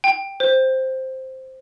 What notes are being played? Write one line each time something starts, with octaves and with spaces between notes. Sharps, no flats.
G5
C5